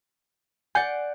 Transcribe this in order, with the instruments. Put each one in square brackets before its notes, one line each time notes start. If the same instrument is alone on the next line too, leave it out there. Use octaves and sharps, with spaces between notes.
[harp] D5 F#5 G6 [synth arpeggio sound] G#5 C7